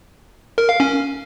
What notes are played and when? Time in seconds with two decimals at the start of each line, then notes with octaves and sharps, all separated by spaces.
0.58 A#4
0.69 F5
0.80 C#4